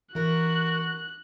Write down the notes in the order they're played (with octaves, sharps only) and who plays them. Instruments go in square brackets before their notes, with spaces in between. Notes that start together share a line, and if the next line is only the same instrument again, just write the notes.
[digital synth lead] E3 [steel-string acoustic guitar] E4 A#4 [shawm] F#4 [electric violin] F#6